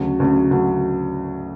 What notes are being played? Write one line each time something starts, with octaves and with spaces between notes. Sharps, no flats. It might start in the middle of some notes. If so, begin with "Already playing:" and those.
Already playing: D2 C#3 F#3
D2 C#3 F#3
D2 C#3 F#3